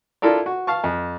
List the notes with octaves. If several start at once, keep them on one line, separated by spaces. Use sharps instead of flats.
D4 E4 F4 A4 A#4 D5
F#4
F5 A5 C#6
F2